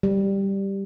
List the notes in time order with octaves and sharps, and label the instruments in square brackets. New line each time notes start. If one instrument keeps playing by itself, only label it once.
[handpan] G3